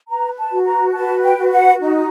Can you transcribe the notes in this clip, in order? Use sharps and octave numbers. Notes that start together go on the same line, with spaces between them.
B4 A#5
A5
F#4
A#5
B4 A5
G5
F#4
F#5
D#4